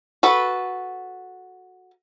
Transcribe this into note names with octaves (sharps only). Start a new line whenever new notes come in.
F#4 A4 B4